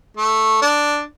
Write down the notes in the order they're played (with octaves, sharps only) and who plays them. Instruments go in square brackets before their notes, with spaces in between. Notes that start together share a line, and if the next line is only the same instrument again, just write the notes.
[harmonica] A3
D4